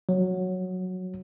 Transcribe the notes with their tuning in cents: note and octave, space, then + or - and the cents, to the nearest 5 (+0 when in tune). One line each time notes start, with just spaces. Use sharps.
F#3 -5